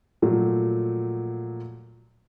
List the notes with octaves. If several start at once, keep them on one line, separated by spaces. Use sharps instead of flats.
A#2 F3 F#3 A3